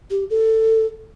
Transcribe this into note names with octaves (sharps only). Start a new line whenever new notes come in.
G4
A4